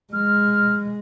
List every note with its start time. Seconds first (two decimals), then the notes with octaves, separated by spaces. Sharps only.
0.13 G#3 F6